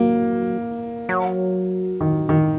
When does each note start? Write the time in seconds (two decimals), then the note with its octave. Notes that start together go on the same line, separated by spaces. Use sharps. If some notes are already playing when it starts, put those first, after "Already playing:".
Already playing: F#3 A#3
1.09 F#3
2.01 D#3
2.29 D#3